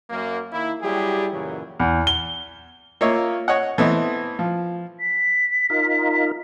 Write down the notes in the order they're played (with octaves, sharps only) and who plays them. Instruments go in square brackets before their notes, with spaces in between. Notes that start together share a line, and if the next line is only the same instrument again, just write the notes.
[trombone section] F#2 A#3
D#3 A#3 E4
F#3 G3 E4 G4 G#4
F#2 A#2 C#3 E3 F#3
[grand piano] E2
G7
[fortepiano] A#3 F4 C#5 D#5 E5
C#5 D#5 F#5
E3 A3 B3 C4 E4 D#5
F3
[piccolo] B6
[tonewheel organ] D#4 F4 A#4